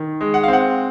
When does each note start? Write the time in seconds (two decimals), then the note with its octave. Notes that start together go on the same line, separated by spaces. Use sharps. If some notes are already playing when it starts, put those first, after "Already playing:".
Already playing: D#3
0.21 G#3
0.34 F#5
0.43 F5
0.48 C4 F#5